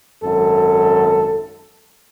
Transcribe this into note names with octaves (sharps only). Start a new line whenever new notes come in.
G#1 F#2 A4